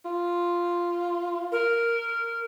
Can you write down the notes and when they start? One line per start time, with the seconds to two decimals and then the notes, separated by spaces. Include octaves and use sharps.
0.05 F4
1.52 A#4